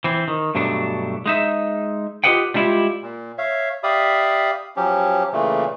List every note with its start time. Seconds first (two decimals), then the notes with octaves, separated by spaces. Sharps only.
0.04 E3 C4
0.28 D#3
0.55 G2 B2 F#3 A3 D4
1.26 G#3 D#4 E5
2.24 F4 G4 B4 D#5 F#5 G5
2.54 G3 G#3 D4 E4 F4 G4
3.01 A#2
3.38 C#5 E5 F5
3.83 G4 D5 E5 F5 B5 D#6
4.76 F3 F#3 C#4 G4
5.33 A#2 C#3 E3 A3